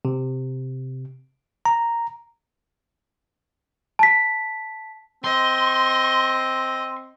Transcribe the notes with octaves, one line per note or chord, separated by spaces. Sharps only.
C3
A#5
A5 B6
C4 D#5 C6